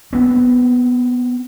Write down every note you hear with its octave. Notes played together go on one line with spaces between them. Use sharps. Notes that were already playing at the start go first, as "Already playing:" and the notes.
B3 C4